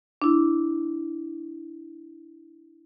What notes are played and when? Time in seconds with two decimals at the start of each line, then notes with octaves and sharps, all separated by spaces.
0.22 D4 E4